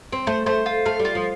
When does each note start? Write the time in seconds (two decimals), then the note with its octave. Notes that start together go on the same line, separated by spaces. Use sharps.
0.12 C4
0.27 A3 C5
0.46 A3 C5
0.66 F4
0.85 A3 F5
0.99 G3
1.05 F4
1.15 F3